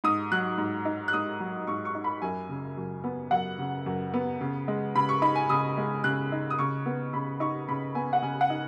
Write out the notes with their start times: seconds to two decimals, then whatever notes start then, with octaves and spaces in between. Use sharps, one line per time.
0.04 G#2 D#6
0.32 F#3 F#6
0.58 G#2
0.85 D#4
1.08 F#6
1.13 G#2 D#6
1.40 F#3
1.67 G#2 C#6
1.85 C#6
1.95 D#4
2.04 B5
2.22 F#2 G#5
2.49 C#3
2.77 F#2
3.04 B3
3.31 F#2 F#5
3.59 C#3
3.86 F#2
4.14 B3
4.41 C#3
4.68 G#3
4.95 C#3 B5
5.09 C#6
5.22 D#4 B5
5.35 G#5
5.49 C#3 D#6
5.77 G#3
6.04 C#3 F#6
6.32 D#4
6.50 D#6
6.59 C#3 C#6
6.86 B3
7.13 C#3 B5
7.40 D#4 C#6
7.69 C#3 B5
7.95 B3 G#5
8.13 F#5
8.22 C#3 G#5
8.41 F#5
8.50 D#4